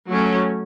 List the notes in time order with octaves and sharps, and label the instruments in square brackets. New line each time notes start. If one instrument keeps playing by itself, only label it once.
[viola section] F#3 A3 C#4